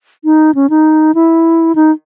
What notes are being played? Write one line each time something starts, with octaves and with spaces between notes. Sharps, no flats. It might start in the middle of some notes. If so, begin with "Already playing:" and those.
D#4
C#4
D#4
E4
D#4